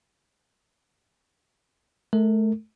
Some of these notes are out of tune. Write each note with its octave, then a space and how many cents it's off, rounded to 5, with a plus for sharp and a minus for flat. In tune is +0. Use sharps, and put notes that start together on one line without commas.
A3 -25 A#4 -40